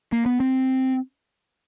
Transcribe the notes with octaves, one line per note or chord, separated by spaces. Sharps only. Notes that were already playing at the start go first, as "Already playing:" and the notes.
A#3
B3
C4